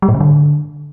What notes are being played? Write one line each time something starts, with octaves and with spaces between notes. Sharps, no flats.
G3
A2
C#3
D3